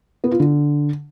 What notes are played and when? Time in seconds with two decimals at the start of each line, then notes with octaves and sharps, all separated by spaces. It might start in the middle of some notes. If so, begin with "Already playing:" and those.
0.24 B3
0.32 F4
0.40 D3